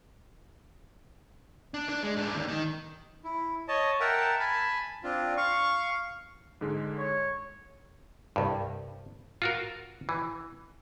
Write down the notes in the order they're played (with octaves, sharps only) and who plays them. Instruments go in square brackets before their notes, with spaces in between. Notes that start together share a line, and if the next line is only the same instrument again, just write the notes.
[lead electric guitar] D4
D4
G#3
G#2 D4
D#2
D#3
[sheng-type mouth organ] E4
C#5 D#5 A5
A#4 E5 F#5 G5 A5 A#5
G#5 A5 B5
C4 D4 F4
F5 C#6
[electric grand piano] G#2 D3 G#3
[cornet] C#5
[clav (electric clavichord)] C2 G2
F4 F#4 A#4
E3